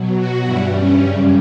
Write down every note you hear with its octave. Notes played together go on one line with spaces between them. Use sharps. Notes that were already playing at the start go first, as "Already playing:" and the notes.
Already playing: B2 F#3
F#4
G2 E3 G3 E4
C#4
F#2 C#3 G3